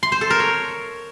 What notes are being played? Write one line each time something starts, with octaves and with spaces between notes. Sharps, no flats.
C6
C5
A4
A#4
C#5